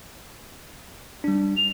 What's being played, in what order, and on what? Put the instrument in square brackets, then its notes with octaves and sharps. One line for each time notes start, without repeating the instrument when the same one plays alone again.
[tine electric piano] G3 D4
[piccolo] F7